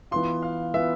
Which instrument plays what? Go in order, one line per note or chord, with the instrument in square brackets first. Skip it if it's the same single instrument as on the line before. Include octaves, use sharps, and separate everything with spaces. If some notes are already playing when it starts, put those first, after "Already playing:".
[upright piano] E3 B3 F4 [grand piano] C6
[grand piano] F5
[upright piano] E3 B3 F4 [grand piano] E5